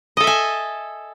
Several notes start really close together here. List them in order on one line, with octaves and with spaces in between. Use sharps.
D#5 A4 E5 G#5